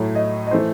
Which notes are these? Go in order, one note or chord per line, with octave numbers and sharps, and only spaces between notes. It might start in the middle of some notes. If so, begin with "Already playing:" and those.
Already playing: A2 F#3 A3
D#5
D#5
E3 A3 C5